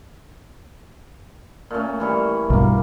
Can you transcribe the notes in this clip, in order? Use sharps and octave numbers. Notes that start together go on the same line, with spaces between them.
A#2 A3 C#4
E3 G3 A4
B1 G2 A#3